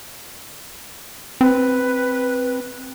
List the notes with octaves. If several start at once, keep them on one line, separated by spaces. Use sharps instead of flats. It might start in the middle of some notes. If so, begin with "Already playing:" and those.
C4 B4